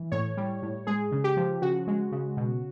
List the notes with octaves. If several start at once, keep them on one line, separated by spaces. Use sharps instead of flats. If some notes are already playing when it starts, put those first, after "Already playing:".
Already playing: E3
A2 C#5
G3
A2
G#3 G#4
C#3
G4
F3
C#3 F#4
G#3
C#3
B2